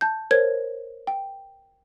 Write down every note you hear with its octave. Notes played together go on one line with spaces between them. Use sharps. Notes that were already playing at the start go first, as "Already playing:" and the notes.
A5 G6
A#4 C5 C#5 G#6
G5